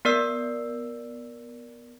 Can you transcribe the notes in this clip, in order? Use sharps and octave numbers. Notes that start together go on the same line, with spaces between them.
B3 A#4 D5 E6 C7